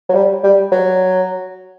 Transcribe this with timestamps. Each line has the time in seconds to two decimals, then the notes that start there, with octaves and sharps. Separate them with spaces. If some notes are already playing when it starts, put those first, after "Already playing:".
0.09 F#3
0.14 G3
0.43 G3
0.72 F#3